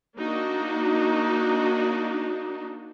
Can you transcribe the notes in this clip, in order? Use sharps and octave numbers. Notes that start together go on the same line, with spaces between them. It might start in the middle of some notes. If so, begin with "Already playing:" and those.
A#3 D4 D#4 F#4